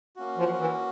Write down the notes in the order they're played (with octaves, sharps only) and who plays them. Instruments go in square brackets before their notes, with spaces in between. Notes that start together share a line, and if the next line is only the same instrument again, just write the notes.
[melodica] A#3 C#4 F#4
[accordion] F3
E3